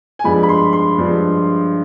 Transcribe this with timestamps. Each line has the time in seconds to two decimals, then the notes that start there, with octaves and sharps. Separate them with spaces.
0.19 G#5
0.24 G2 F3 G#3 B5
0.43 B5
0.49 C6
0.73 C6
0.98 G2 F3 G#3